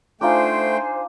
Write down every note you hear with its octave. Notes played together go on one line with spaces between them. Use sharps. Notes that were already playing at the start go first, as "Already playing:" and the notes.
A3 D4 D#4 F4 C5 G5 G#5